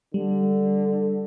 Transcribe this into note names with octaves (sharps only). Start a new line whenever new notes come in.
D3 G3